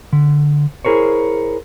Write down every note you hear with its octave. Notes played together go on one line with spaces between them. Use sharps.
D3
E4 G#4 A#4 C5 C#5